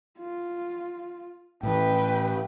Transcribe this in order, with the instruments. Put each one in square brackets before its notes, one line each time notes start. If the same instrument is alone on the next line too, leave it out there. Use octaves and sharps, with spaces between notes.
[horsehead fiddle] F4
[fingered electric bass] A2 E3 [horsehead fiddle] B4 G5